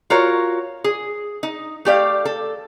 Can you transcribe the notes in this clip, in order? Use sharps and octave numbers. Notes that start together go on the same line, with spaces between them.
F4 F#4 A#4 C#5
G#4
D#4
A3 G4 D5 F5
A4